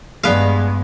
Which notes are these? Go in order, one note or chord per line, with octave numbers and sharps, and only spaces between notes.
G2 G#3 B3 G#4 D5 F5